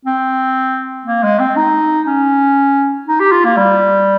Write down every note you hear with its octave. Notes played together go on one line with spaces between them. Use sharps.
C4
A#3
G#3
C4
D#4
C#4
D#4
G4
F4
A#3
G3